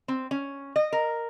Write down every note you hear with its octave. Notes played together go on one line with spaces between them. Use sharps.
C4
C#4
D#5
A#4